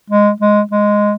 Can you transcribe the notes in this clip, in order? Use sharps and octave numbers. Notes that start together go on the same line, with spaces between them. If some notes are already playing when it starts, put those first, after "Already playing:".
G#3
G#3
G#3